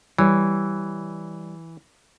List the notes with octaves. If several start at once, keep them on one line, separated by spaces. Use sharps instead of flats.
E3 G3 C#5